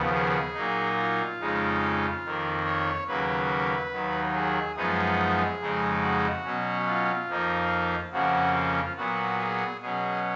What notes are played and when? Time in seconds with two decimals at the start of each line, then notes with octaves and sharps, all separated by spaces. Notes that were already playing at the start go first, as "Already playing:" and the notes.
Already playing: D#2 C#3 F3 B3
0.13 G#4
0.54 A#2 F#3 A#3 D#4
0.96 F4
1.39 F2 C#3 G#3 D#4
2.23 F2 D#3 A#3
2.66 C#5
3.07 D#2 C#3 F#3 A#3 B4
3.92 D#2 D#3 F#3
4.34 G#4
4.76 F#2 F3 G#3 B3 D#4 G#4
5.60 F2 C#3 G#3 D#4
6.02 F#4
6.44 B2 F#3 C#4
6.87 F4
7.28 F2 F3 A#3 D#4
8.12 F2 C#3 F3 A#3 C#4 F#4
8.55 F4
8.97 A#2 F#3 B3 F#4
9.39 G#4
9.81 B2 F#3 C#4 G#4